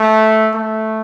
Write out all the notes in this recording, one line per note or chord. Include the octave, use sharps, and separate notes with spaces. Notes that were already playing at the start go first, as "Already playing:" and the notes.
Already playing: A3
A3